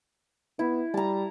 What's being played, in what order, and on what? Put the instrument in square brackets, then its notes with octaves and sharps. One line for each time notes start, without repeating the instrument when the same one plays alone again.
[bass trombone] B3 [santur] E4
[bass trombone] G3 [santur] A5 A#5